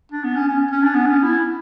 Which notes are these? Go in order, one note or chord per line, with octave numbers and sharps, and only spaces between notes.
D4
B3
C#4
C#4
C#4
D4
B3
C#4
E4